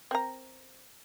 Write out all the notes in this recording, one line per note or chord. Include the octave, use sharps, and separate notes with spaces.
C4 A#4 A#5